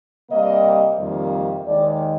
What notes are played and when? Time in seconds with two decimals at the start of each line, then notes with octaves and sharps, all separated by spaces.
0.30 C3 G3 A#3 D#5
0.98 F2 C3 D#3 G3 A#3
1.65 D#2 D#3 G#3 D5